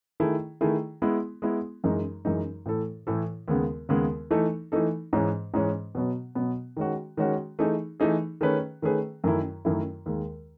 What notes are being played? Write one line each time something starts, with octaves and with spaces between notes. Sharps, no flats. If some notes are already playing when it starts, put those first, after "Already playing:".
D#3 A3 E4 G#4
D#3 A3 E4 G#4
G#3 B3 E4
G#3 B3 E4
F#2 E3 G#3 D#4
F#2 E3 G#3 D#4
A2 E3 A3 E4 A4
A2 E3 A3 E4 A4
D#2 C#3 G#3 B3
D#2 C#3 G#3 B3
E3 A3 D#4 A4
E3 A3 D#4 A4
G#2 E3 G#3 C#4
G#2 E3 G#3 C#4
B2 F#3 B3
B2 F#3 B3
D#3 G#3 C#4 F#4
D#3 G#3 C#4 F#4
E3 A3 D#4 G#4
E3 A3 D#4 G#4
D#3 A3 C#4 G#4 B4
D#3 A3 C#4 G#4 B4
F#2 D#3 A3 E4
F#2 D#3 A3 E4
D#2 D#3 G#3